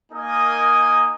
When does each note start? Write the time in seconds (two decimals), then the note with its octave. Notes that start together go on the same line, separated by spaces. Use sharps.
0.12 A#3 D#4 A#4 D#5 G#5 D#6